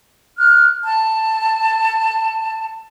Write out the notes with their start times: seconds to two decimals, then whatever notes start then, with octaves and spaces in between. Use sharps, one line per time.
0.37 F6 F#6
0.84 A5